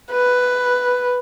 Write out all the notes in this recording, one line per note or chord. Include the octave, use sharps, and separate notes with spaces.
B4